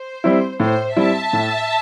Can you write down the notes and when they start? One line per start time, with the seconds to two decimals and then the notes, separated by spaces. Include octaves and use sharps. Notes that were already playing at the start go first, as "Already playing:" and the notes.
Already playing: C5
0.24 G3 C4 E4
0.60 A2 C5
0.96 G3 C4 E4 E5 A5
1.33 A2